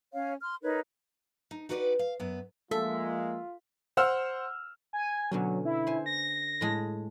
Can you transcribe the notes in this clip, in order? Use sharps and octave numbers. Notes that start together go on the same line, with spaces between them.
C#4 C#5 F5
C6 F6
D#4 A#4 B4 C#5
D#4
D#4 F#4 G4 B4 C#5 D5
F5
F#2 B3
F3 G#3 A#3 F4 A4 E5
C5 F#5 E6 F6
G#5
B2 D3 F#3 C#4
E4
C5 G#5
A#6
A2 G#3 G#4